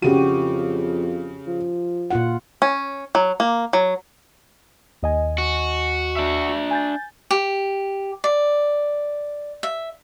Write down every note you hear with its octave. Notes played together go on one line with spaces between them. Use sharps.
F2 C#3 F#4 G4 D#7
F3
A#2 F4 F#5
C#4
F#3
A#3
F#3
D#2 D#5 G#5
F#4
D4 E5
G#5 G6 A6
G4
D5
E5